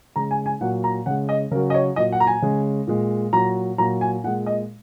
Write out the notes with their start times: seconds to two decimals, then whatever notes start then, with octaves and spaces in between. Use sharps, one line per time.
0.16 C#3 G#3 A#5
0.31 G#5
0.46 G#5
0.61 A#2 F#3 F#5
0.84 A#5
1.06 C#3 G#3 F#5
1.29 D#5
1.51 C#3 A#4
1.55 F#3
1.70 D#5
1.74 C#5
1.96 A#2 F#3 D#5
2.12 F#5
2.20 A#5
2.27 G#5
2.42 C#3 G#3
2.87 A#2 G#3
3.33 A#2 F#3 A#5
3.78 A#2 F#3 A#5
4.01 G#5
4.24 A#2 G#3 F#5
4.46 D#5